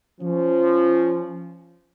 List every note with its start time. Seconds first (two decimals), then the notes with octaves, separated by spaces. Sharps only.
0.21 F3 C#4